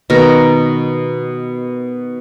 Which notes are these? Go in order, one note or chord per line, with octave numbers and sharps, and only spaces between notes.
B2 D#3 A#4